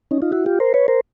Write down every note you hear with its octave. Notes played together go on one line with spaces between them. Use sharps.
C#4 D#4
D#4 F4
E4 F#4
F4 G4
A#4 C5
B4 C#5
A#4 C5